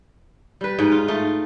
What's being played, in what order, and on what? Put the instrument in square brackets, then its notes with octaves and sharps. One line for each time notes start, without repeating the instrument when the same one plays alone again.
[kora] G3 B4
G#2 D#4
F4
A3 D#4 F4